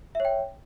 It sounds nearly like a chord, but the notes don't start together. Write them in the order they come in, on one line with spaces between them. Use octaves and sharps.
E5 C#5 G5